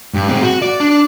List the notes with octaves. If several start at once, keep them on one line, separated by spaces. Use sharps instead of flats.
G2
C4 G#4
F#4
D5
D4